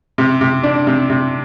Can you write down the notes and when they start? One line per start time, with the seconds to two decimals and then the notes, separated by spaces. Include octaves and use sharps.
0.18 C3
0.41 C3
0.63 D4
0.87 C3
1.10 C3